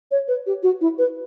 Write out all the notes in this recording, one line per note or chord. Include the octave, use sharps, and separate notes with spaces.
C#5
B4
G4
F#4
E4
B4